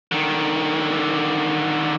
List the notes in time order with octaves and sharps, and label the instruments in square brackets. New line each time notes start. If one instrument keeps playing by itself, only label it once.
[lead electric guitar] D3 D#3